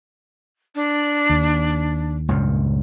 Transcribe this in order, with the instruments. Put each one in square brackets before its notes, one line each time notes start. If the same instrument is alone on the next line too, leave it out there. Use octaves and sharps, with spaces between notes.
[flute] D4
[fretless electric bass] D#2
[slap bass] C#2 G2 A#2